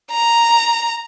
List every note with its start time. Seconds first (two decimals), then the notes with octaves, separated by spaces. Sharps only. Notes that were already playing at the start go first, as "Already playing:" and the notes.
0.11 A#5